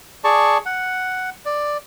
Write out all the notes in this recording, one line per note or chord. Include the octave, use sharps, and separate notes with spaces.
G#4 D5 A5 C#6
F#5
D5